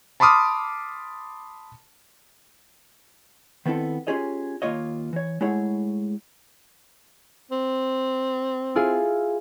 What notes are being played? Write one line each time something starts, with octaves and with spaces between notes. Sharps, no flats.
A5 B5 C6 D6 D#6 F6
D#3 B3 C4 E4 A4
C#4 F4 G4 G#4 C#5 D#5
D#2 B2 A#3 F4 C#5 D#5
E3 C#5
G#3 A3 E4 G#4 C#5 F#5
C4
E4 F4 G#4